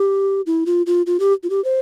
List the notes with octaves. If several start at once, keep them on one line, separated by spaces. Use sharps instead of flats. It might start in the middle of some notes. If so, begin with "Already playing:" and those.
Already playing: G4
E4
F4
F4
F4
G4
F4
G4
C5